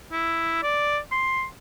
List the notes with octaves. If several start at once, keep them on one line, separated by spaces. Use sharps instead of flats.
E4
D5
C6